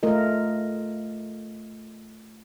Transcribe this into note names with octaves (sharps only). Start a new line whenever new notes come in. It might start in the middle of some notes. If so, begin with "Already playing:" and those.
A3 F4 A#4 D#5